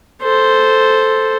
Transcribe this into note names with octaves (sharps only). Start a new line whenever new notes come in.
A4 C5